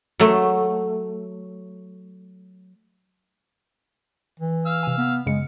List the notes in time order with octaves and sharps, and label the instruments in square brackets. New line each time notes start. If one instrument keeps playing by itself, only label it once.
[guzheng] F#3 A3
[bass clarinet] E3
[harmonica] F5 E6 F6
[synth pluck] C3 G#5
[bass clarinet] B3
[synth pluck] F#2 C#3 C#7 [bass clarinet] G#3